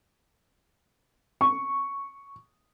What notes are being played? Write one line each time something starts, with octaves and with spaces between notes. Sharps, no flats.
C#6